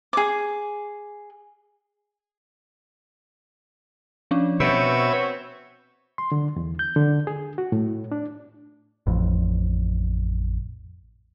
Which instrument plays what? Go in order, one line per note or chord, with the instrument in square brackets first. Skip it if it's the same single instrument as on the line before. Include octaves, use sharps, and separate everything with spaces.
[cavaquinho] G#4 D6
[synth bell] F3 C#4 D4
[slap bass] B2 [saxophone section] C4 F#4 C#5 [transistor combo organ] B4 E5 [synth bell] G6
[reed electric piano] C6
D3
E2
G6
D3
G#4
F#4
A2
D4
[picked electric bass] A1 F2